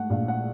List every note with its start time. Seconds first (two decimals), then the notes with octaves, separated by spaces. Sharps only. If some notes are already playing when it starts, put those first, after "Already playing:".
Already playing: G#2 A3 F#5
0.10 A#1 F5
0.28 F#5